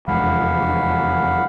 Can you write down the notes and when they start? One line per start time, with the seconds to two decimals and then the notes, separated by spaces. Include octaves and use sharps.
0.08 F1 E2 G#3 F5 F#5 B5